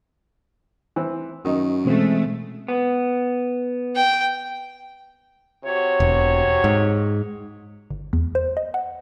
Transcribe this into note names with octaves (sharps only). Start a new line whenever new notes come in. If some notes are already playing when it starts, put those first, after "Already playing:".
E3 C4
F#2 D#3 D#4
B2 E3 G#3 A3 C4
B3
G5
C3 F#4 C#5
E1
G#2
G1
E2
C5
D#5
F#5